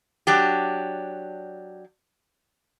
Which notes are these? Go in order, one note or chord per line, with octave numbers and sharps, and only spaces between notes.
F#3 D4 G4